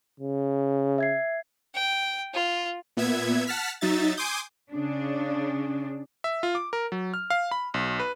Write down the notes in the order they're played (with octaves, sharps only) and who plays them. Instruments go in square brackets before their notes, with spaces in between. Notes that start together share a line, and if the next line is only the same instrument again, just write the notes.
[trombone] C#3
[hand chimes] E5 G#6 C7
[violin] G5
F4
[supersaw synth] A#2 B3 E5 G#6
F#5 A5 F6 B6
F#3 D#4 E5 A6
G#5 C6 D6 D#6 G6
[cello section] C#3 D4
[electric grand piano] E5
F4
D6
A#4
F#3
F6
F5
B5
B1
B4